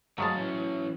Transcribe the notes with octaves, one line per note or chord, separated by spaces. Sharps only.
F#3 G#3 A3 F5 A5
E3 C#4